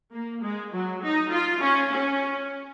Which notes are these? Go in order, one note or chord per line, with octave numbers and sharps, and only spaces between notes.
A#3
G#3
F#3
D#4
F4
C#4
C#4